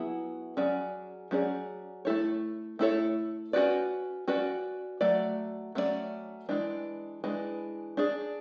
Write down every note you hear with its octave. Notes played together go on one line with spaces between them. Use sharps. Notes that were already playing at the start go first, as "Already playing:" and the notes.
Already playing: F#3 B3 E4 G#4
F#3 C#4 G#4 D5
F#3 C#4 G#4 D5
A3 E4 A4 C#5
A3 E4 A4 C#5
C#4 F#4 B4 D5
C#4 F#4 B4 D5
F#3 A3 D5
F#3 A3 C#4 G#4 D5
E3 G#3 D4
E3 G#3 D4
D4 G#4 D5